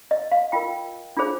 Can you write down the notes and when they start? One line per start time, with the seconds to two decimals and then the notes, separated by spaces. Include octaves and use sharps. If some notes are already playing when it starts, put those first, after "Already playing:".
0.11 D#5
0.32 F5
0.52 F4 A#4 G5
1.17 D4 F4 G#4 C5